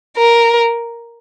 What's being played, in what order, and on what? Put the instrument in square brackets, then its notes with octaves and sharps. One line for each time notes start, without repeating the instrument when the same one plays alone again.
[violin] A#4